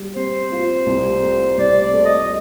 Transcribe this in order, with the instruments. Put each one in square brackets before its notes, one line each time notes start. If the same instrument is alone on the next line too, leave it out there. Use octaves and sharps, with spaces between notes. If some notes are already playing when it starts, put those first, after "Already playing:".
Already playing: [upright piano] G3
[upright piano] C4 [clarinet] C5
[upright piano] F4
C2
A3
[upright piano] C2 [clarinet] D5
[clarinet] D5
[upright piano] A3
[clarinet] D#5